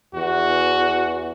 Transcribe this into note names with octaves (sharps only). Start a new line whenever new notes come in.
E2 F#4